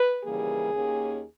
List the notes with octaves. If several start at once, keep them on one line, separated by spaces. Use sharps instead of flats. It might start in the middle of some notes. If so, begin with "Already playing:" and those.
Already playing: B4
D#2 C#3 E3 G3 A#3 G#4
D#2 D#3 A#3 C#4